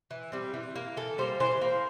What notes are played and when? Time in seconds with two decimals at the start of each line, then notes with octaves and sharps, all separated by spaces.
0.11 E3
0.32 G3 C4
0.54 E3
0.76 A#3
0.97 E3 A4
1.18 G3 A#3 C5
1.40 E3 C5
1.62 A#3